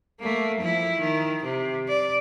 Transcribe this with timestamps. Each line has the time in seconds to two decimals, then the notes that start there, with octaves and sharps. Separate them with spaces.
0.21 A3 A#3
0.60 F3 E4
0.98 D#3
1.43 C3
1.89 D5